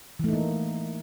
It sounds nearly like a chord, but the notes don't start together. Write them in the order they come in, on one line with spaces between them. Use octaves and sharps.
E3 A3 D#4 A#3